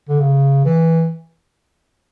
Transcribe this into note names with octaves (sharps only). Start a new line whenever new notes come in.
D3
C#3
E3